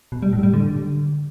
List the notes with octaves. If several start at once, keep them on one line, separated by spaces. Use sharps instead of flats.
B2
G3
A2
G3
D3